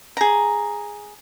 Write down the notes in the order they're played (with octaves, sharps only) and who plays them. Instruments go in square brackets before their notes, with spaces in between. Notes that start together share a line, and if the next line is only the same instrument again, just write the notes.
[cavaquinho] G#4 A#5